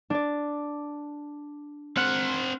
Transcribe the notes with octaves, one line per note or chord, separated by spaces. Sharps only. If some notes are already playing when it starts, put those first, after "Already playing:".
D4 D5
C4 F#5 F6 F#6